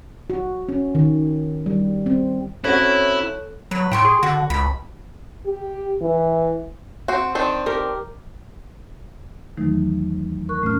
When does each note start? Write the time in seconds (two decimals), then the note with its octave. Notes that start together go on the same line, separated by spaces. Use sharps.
0.30 F#4
0.69 C#4
0.95 D#3
1.66 G3
2.06 C4
2.64 C4 C#4 E4 F#4 A4 C#5 F#6
3.71 F#3 B4
3.91 A2 G5 C6 C#6
4.05 G#4
4.23 D3 F#4
4.50 C#2 B5
5.46 G4
6.02 E3
7.08 C4 F#4
7.35 D#3 C4 D4
7.66 G4 A#4
9.57 E2 D#3 E3 F#3 A3 D#4
10.49 A#4 C#6 F#6
10.62 A2 A3 C#4 F6